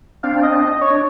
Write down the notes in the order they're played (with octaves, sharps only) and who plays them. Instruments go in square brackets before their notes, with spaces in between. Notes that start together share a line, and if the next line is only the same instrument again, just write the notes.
[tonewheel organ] C4 D4 [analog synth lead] F5
[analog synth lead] D#5
D#5
C#5
[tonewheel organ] D4